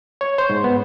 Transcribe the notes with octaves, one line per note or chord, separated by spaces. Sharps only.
C#5
C5
G#2
B3